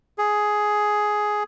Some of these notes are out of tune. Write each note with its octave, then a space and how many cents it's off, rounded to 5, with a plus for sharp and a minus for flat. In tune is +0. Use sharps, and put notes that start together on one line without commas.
G#4 +10